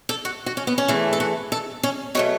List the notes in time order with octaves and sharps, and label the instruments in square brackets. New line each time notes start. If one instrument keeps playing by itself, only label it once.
[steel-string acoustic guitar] A4
F#4
F#4
C#4
B3
C#4
E2 E3 A3
A4
F#4
A4
C#4
B2 F#3 A3 C#5